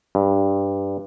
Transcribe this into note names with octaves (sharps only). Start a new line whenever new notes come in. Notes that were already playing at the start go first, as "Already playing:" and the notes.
G2